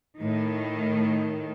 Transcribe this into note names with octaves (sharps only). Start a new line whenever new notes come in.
A2 D#3